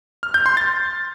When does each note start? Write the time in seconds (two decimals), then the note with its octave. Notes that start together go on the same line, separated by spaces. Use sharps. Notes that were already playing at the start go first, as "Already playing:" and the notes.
0.23 F6
0.34 G6
0.46 C6
0.57 A6